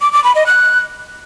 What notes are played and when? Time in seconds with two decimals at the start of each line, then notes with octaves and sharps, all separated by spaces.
0.01 D6
0.13 D6
0.24 B5
0.35 D#5
0.47 F#6